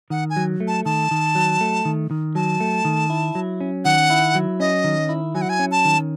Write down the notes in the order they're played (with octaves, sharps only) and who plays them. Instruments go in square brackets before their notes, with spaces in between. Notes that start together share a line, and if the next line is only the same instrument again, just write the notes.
[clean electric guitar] D#3 [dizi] F#5
[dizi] G#5
[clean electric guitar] F#3
A3
[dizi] A5
[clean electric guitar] D#3 [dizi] A5
[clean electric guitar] D#3
F#3
A3
D#3
D#3
[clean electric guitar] F#3 [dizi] A5
[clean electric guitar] A3
D#3
E4
F#3
C#4
[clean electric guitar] D#3 [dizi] F#5
[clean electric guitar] E4
F#3
[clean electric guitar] C#4 [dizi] D#5
[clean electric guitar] D#3
E4
[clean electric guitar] F#3 [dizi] G#5
[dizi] F#5
G#5
[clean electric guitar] C#4
[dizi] A5
[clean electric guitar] D#3